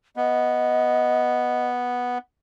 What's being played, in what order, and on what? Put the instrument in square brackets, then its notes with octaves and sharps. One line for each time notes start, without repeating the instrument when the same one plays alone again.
[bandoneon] B3 [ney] D#5